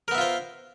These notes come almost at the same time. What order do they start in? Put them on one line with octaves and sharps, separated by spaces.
A#4 B3 E5 F4 C5